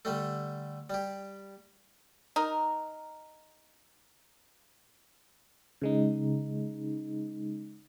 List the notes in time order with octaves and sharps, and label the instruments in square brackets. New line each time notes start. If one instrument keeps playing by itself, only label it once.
[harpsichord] D3 G3 A3
G3 G4
[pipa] D#4 A#4
[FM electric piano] C#3 G#3 D#4